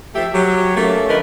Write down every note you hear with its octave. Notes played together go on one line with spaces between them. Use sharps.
F3 A3 G4 E5
F#3 G4
A3 A#3 C#4
D3 F3 A3 A#4 B4 D#5